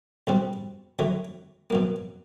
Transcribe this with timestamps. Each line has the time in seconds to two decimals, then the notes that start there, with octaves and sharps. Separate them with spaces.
0.27 C#2 B2 G3 C4
0.99 D2 D3 F#3 A3
1.70 B2 F#3 A#3